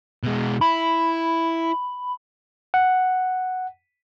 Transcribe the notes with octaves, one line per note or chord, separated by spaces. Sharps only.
B2 G#3
E4 B5
F#5